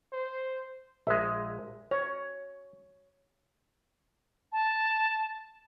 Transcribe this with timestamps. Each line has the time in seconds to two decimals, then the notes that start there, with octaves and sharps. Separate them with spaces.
0.12 C5
1.07 A#1 G#3 E5
1.91 C#5 A#5
4.52 A5